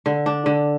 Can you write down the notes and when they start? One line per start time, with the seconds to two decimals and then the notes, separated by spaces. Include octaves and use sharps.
0.06 D3
0.26 D4
0.46 D3